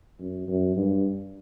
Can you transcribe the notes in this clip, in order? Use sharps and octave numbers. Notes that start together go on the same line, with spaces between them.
F#2
F#2
G2